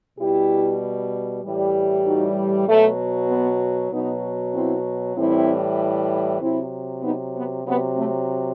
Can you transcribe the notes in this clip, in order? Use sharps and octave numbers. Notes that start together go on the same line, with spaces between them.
B2 G3 E4 G4
A2 E3 G3
D#4 F#4
B2 F#3 A3
B3
B2 F#3 B3 D#4
C4 E4
A2 E3 G3 C4 E4
C3 F#3 C4 E4
B3 D#4
B3
C3 F#3 B3
A3 C4